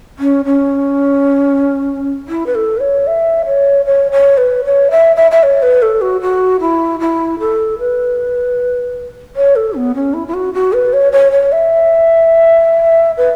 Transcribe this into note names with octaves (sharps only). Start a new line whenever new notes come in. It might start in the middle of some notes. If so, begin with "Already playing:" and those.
C#4
C#4
E4
B4
A4
B4
C#5
E5
C#5
C#5
C#5
B4
C#5
E5
E5
E5
C#5
B4
A4
F#4
F#4
E4
E4
A4
B4
C#5
A4
B3
C#4
E4
E4
F#4
F#4
B4
C#5
C#5
C#5
E5
B4